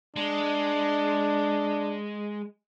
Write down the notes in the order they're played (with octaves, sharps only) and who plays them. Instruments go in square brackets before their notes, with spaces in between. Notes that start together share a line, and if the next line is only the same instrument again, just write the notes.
[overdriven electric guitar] G#3 [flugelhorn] D4